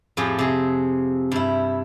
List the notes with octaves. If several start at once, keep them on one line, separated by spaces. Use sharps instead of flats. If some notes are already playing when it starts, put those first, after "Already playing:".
F2 A2 F3 G4 G#4
C3 G#4
G2 E4